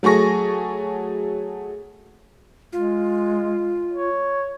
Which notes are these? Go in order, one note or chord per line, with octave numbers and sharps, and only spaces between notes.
F#3 A3 G#4 C#6 A#6
G#3 F4
C#5